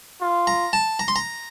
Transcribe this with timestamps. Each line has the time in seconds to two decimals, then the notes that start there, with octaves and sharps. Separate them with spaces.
0.21 F4
0.47 A#5
0.73 A5
0.99 A#5
1.08 C6
1.16 A#5